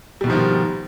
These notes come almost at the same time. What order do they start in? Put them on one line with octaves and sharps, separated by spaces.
G3 B2 G#2 F3 D#3